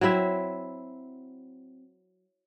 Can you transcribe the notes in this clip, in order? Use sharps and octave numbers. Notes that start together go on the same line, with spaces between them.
F#3 C4 E4 E5